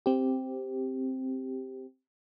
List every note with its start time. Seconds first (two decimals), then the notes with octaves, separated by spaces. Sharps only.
0.06 C4 G4